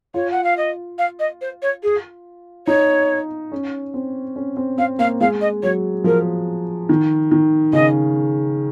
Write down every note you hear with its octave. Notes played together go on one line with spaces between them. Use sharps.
F4 C#5
F#5
F5
D#5
F5
D#5
C5
C#5
G#4
D#4 C#5
C#4
C4
C#4
C4
C4 F5
A#3 F5
G#3 F5
D#5
F#3 C#5
F3 A#4
D#3
D#3
C#3 D#5